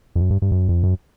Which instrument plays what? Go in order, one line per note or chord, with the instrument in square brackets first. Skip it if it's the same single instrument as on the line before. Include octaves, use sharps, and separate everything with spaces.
[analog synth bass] F2
F#2
G2
G2
F#2
F2
F#2